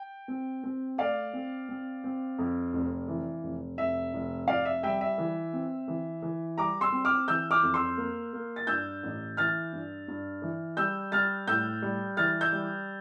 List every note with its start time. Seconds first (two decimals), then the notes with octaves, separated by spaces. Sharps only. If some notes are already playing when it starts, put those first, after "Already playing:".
Already playing: G5
0.28 C4
0.64 C4
0.98 A3 D5 F5
1.33 C4
1.69 C4
2.04 C4
2.38 F2
2.73 F1
3.08 E3
3.44 F1
3.78 F1 E5
4.14 F1
4.48 F1 D5 F5
4.65 E5
4.83 G3 E5 G5
5.01 E5
5.18 E3
5.53 C4
5.88 E3
6.22 E3
6.58 G3 A#5 D6
6.81 C6 E6
6.92 C4
7.05 D6 F6
7.28 E3 E6 G6
7.51 D6 F6
7.62 F2
7.74 C6 E6
7.98 A#3
8.33 A#3
8.56 A6
8.67 G2 E6 G6
9.03 A1
9.37 E3 F6 A6
9.73 G2
10.08 G2
10.42 E3
10.77 G3 E6 G6
11.12 G3 F6 A6
11.47 A2 E6 G6
11.82 G3
12.17 E3 F6 A6
12.41 E6 G6
12.52 G3